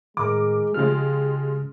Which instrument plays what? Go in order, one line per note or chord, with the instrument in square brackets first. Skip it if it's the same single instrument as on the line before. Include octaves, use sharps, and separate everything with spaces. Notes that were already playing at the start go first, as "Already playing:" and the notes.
[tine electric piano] A2 D#3 [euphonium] G#3 [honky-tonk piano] A#4 D6
[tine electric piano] C#3 F6 [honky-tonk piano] F3 G#3 [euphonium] G4